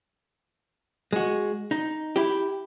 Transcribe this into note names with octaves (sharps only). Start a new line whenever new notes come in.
G#3 F#4
D#4
E4 G4